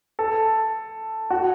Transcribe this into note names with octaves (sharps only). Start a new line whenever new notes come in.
A4
F#4